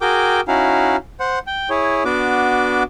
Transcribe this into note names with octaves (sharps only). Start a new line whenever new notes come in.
F#4 G#4 A#4 G5 D6
C#4 D#4 E4 F#4 F5
C5 F#5
G5
E4 G#4 C#5
B3 D4 F#4 D6